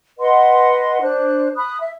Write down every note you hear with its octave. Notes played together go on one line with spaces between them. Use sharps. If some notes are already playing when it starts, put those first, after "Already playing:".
B4 D#5 F#5 C6
D4 C5 F#6
B5 D#6 F#6
E5